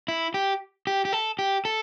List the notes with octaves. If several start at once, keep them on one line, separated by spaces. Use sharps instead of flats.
E4
G4
G4
G4
A4
G4
A4